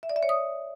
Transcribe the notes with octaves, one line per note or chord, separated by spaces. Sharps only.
E5
D5
E5
C#5
D#6